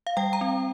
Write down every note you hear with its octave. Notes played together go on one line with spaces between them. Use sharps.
F5
G3 G5
A#5
C4